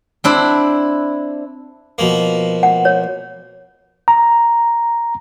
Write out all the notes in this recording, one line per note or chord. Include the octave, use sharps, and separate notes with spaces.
C4 D4 E4
B2 F3 A#3
F#5
C#5
A#5